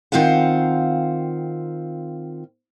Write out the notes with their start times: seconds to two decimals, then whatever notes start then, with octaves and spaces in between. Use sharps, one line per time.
0.12 D#3 C4 F4 F5 F#5